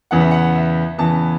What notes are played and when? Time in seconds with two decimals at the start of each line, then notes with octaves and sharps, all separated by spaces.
0.11 E2 C#3 E3 B3 F#5
0.20 E5
0.31 F#5
0.55 E5
0.98 E2 C#3 E3 B3 A5